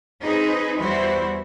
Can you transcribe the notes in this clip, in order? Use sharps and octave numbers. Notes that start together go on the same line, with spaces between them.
C4 D#4 G#4 B4
E2 E3 G3 E4 F#4 C5